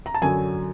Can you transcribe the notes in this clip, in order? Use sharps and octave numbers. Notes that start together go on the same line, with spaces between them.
A#5
A5
F#2 D3 F#3 G#5